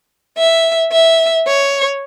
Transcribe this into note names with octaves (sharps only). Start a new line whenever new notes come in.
E5
E5
C#5